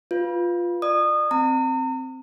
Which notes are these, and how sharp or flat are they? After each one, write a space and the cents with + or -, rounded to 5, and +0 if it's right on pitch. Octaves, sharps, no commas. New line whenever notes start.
F4 +0 B4 +0
D5 +35 D#6 -25
C4 +0 A#5 -40